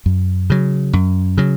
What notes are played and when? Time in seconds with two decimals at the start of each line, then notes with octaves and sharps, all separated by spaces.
0.06 F#2
0.50 C#3 F#3
0.93 F#2
1.38 C#3 F#3